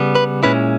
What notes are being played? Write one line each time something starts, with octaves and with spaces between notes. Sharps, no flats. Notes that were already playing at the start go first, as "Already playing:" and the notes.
Already playing: C#3 G3 B3
B4
A#2 G#3 C#4 E4 B4